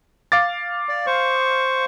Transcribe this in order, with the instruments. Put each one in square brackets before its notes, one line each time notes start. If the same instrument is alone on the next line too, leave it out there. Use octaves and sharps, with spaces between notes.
[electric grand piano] F5 D6 A6
[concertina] D5
C5 C#6